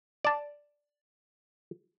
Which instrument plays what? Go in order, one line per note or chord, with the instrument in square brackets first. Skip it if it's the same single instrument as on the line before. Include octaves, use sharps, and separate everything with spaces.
[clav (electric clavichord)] D5 A5